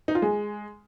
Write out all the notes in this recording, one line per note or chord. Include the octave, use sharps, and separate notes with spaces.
D#4
F4
G#3